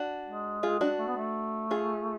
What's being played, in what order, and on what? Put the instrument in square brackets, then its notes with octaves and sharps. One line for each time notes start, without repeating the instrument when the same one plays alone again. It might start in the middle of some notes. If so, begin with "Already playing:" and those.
Already playing: [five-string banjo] D4 F#4
[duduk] G#3
[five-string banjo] F4 G#4
D4 F#4
[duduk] A3
B3
A3
[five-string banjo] F4 G#4